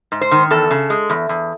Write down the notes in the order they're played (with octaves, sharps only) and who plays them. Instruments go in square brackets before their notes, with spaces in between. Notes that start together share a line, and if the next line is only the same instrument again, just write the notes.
[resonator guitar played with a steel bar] G#2
C5
D#3
E2 A4
C#3
G#3
E2
E2